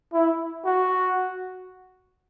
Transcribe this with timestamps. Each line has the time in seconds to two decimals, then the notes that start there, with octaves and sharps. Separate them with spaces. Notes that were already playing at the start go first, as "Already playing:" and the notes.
0.14 E4
0.66 F#4